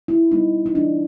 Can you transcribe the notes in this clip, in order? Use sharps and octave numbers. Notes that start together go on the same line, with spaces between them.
E4
G3 B3 D#4
D#4
E3 D4